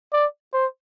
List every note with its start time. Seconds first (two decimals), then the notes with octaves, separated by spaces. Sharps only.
0.13 D5
0.53 C5